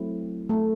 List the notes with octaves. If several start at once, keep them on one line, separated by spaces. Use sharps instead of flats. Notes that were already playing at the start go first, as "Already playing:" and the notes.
Already playing: F#3 A3 C4 E4
A3 A4